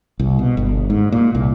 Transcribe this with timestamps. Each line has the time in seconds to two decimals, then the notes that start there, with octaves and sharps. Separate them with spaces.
0.20 C2
0.39 B2
0.57 G1
0.90 G#2
1.12 A#2
1.35 C2